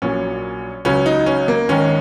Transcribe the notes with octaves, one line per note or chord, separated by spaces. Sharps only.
A#1 A#2 F#3 C#4
C#2 C#3 F#3 C#4
D#4
C#4
A#3
G#1 G#2 D#3 C#4